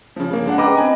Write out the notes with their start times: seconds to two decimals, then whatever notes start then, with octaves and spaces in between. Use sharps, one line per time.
0.16 C#3 F3
0.31 C#3 A#3
0.45 G#3 D4 F#5
0.58 B4 D#5 G5 A#5 D6
0.77 C4 D#5 G#5